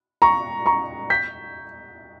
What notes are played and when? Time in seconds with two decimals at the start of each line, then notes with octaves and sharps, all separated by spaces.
0.22 A#5 C#6
0.66 A#5 C#6
1.10 G6 B6